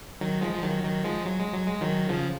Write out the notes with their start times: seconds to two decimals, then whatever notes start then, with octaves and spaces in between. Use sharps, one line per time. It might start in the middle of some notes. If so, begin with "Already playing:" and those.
0.21 D#3 F#3
0.41 F3 G#3
0.54 F3
0.63 D#3 F#3
0.84 D#3 F#3
1.04 F3 G#3
1.26 F#3
1.40 G#3
1.53 F#3
1.67 G#3
1.81 D#3 F#3
2.09 C#3 F3